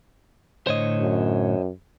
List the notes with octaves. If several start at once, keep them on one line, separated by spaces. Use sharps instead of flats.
A2 D3 C5 C#5 D#5
F#2